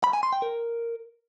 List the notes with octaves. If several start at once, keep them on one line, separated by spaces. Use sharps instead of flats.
B5
G#5
C6
G5
A#4